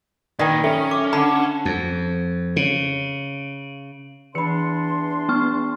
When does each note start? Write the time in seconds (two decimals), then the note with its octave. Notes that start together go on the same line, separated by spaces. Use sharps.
0.39 A#2 D#3 B4 D5 G5
0.64 C#4 A4 E5
0.91 D6
1.13 D3 F#5 A5 B5
1.65 F2
2.56 C#3
4.35 E2 E3 D4 B5 C6 C#7
5.29 B3 C#6 F6